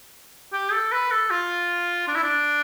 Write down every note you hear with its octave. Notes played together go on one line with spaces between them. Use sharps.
G4
A4
B4
A4
F4
D4
E4
D4